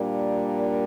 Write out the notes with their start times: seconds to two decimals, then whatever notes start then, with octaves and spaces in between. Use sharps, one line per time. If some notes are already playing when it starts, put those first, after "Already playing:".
Already playing: A#2 G3 A#3 D4